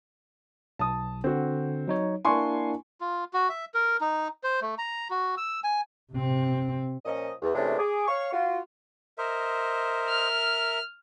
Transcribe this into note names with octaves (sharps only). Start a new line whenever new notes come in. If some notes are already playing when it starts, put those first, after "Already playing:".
B1 A5 D#6
D3 C4 F#4
F#3 D#4 C#5
A#3 D4 E4 G#5 C6 C#6
F4
F#4
E5
A#4
D#4
C5
A3
A#5
F#4
E6
G#5
C3 C4
A#2 F3 C#4 D#5
E2
C3 E3 G#3 A3 C#4 D4
G#4 D6
C#5 F5 C#6
F4 F#4
A#4 C5 D#5 E5
F6